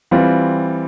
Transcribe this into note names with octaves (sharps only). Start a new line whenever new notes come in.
E3 G3 C4 F4